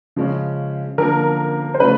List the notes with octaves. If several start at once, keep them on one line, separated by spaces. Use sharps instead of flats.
C#3 F3 G#3 C#4
D3 F3 A#3 A#4
C5
C#3 F3 A3 B4